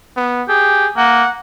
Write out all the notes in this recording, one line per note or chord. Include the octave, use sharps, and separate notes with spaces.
B3
G4 G#4
A#3 F#5